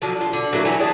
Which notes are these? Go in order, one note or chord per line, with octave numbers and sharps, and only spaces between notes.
D3 F3 F#3
F4
D3
F#3 A3 A#3 E4
E3 F#3 E4 A#5
G#4 D5 G5 A5